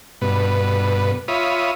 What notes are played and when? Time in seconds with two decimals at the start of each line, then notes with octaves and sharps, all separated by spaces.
0.22 G2 B2 B4
1.28 F4 C#5 E5 B5 D#6